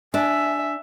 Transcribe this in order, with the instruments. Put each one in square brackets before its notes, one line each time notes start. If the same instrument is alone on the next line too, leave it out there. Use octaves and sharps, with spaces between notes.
[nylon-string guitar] D4 [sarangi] E5 [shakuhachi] G#5